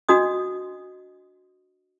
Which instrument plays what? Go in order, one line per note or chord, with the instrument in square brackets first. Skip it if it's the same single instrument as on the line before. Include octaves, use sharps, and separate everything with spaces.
[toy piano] D4 F#4 D#5 D#6